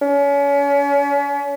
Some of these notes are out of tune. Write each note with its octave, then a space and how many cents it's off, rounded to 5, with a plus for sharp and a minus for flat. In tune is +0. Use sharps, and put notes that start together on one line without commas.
C#4 +35